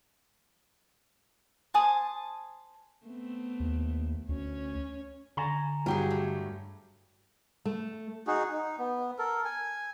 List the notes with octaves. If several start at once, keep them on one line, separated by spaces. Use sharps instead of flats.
C5 G#5 A5 D#6
A3 B3 C4
D#2
D2 C#4 C#5
D3 G#5 A#5 C#6
G2 F#3 G4 G#4 G5
A3
A3
D#4 F#4 G#4
D#4
B3
A4 A#4
G#5